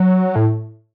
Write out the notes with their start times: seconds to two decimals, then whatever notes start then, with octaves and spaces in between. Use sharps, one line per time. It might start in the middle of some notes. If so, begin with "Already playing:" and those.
Already playing: F#3
0.36 A2